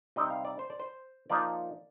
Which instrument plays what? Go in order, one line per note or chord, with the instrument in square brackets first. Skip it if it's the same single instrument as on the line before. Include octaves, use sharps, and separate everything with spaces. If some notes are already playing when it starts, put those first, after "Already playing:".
[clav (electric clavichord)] C3 G3 C4 D#4 D#5
F5
D5
C5
D5
C5
F3 A#3 D#4 D5